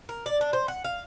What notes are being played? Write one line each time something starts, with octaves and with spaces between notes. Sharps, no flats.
A#4
D5
D4
C5
F#5
F5